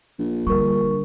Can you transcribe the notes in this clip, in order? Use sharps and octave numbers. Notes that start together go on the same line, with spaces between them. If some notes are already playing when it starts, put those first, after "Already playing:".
A#1
D3 G3 A#4 C#6